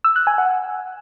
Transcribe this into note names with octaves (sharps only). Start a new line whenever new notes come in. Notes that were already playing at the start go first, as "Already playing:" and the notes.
E6
F#6
G#5
F#5